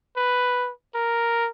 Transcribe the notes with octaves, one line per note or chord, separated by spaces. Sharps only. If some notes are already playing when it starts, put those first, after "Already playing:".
B4
A#4